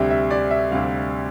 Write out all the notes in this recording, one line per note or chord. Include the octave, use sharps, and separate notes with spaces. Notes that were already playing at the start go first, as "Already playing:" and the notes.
Already playing: D2 C3 G3 E5
E5
D5
E5
D2 C3 G3 F5